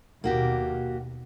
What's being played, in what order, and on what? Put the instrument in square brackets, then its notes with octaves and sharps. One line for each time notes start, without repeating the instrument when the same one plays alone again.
[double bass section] D#2 B2 [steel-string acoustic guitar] A#3 F#4 G4